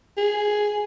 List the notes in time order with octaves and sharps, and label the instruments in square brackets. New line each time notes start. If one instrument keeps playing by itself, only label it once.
[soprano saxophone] G#4